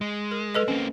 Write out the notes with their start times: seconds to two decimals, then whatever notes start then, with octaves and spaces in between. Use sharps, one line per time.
0.01 G#3
0.31 A#4
0.55 A4 B4 D#5
0.68 A#3 C4 C#4